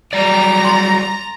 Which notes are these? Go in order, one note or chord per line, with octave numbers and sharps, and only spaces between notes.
F#3 G3 D5 A#5
C6 A6